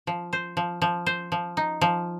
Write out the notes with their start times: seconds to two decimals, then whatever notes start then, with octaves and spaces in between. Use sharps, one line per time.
0.07 F3
0.33 C5
0.57 F3
0.82 F3
1.06 C5
1.32 F3
1.57 D#4
1.81 F3